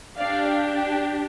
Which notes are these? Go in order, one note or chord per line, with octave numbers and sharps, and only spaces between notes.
D4 G4 D5 F5